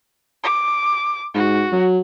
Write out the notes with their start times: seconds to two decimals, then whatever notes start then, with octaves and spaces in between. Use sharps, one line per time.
0.43 D6
1.34 G#2 F#4
1.72 F#3